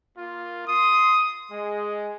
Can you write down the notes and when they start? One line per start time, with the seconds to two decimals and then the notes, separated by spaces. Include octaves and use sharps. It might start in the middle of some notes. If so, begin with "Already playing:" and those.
0.16 A#3 F4
0.66 C6 D#6
1.52 G#3